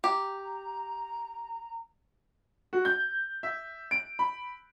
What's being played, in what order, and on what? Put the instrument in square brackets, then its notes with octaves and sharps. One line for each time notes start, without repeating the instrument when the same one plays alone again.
[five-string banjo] G4 [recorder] A#5
[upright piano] F#4
G6
E5
D7
B5